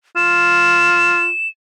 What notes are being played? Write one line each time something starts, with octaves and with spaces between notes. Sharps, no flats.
F4 E7